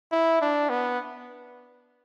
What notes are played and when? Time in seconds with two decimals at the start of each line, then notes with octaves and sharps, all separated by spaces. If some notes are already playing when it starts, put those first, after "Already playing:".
0.12 E4
0.42 D4
0.69 B3